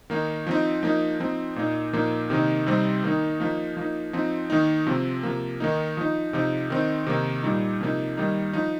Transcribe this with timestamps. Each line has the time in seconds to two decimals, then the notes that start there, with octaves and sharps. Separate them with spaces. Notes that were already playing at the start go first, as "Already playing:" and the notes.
0.10 D#3 A#3 D#4
0.47 F3 C4 D#4
0.83 F3 A#3 D#4
1.20 F3 C4 D#4
1.56 A#2 A#3 D#4
1.93 A#2 F3 A#3 D#4
2.30 C3 D#3 A#3 D#4
2.66 C3 G3 C4 D#4
3.04 D#3 A#3 D#4
3.40 F3 A#3 D#4
3.77 F3 A#3 D#4
4.13 F3 C4 D#4
4.50 D#3 A#3 D#4
4.87 C3 F3 C4
5.23 C3 F3 A#3
5.60 D#3 A#3 D#4
5.97 F3 D#4
6.33 C3 F3 D#4
6.70 D#3 C4 D#4
7.07 C3 D#3 A#3 D#4
7.43 A#2 G3 D#4
7.81 C3 F3 A#3 D#4
8.17 D#3 G3 A#3 D#4
8.53 F3 D#4